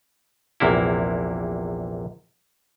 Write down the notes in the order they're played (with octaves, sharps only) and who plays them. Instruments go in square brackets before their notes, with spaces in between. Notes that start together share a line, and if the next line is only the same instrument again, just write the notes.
[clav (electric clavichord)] A#1 E2 C3 A#3 E4